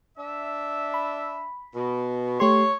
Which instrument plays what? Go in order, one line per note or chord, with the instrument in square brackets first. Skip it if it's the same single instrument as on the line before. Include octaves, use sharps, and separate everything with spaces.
[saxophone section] D4 E5
[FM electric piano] B5
[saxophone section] B2
[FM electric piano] A3 G4 C6 [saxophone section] C#5